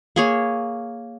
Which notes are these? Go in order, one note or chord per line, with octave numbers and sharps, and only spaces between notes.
A#3 G#4 C#5